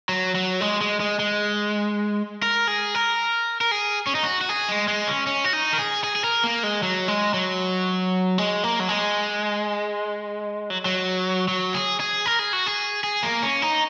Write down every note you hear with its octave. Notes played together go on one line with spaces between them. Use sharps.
F#3
F#3
G#3
G#3
G#3
G#3
A#4
G#4
A#4
A#4
G#4
C#4
D#4
F#4
F#4
G#4
G#3
G#3
C#4
C#4
F#4
D#4
A#4
G#4
G#4
G#4
A#4
A#3
G#3
F#3
G#3
F#3
G#3
A#3
F#3
G#3
F#3
F#3
F#3
G#4
G#4
A#4
G#4
F#4
G#4
G#4
A#3
C#4
D#4